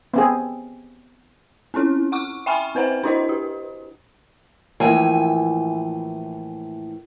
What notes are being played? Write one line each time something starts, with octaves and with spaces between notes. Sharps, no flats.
B3 C4 G#4
C4 C#4 E4 A4
F#5 C#6 D6
E5 G5 G#5 B5 C#6 F6
C4 B4 C5 F#5 A#5
D4 E4 F#4 C5 D#5
G4
A2 E3 F3 A#3 G5 G#5